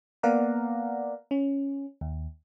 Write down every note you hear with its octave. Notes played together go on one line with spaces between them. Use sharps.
A#3 B3 D5 F5 F#5 A#5
C#4
D#2